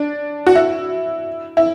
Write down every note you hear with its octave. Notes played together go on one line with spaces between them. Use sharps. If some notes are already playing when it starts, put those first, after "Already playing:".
Already playing: D4
F#4
E4
E4